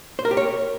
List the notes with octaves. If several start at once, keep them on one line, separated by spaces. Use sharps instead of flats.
C5
A#4
G4
C#5